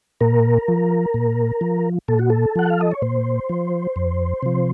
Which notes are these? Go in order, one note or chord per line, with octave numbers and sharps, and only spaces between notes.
A#2 A#4
F3
A#2
F3
A#2 A4
F#4
A4
F3 F#5
F5
D#5
C#5
A#2 C5
F3
F2
C3 F3